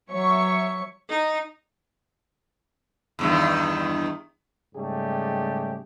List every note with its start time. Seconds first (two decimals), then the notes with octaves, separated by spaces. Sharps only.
0.11 F#3 C#5 E5 C#6 C#7
1.09 D#4
3.19 E2 G2 D#3
4.75 G#2 C#3 G3 A3 G4 G#4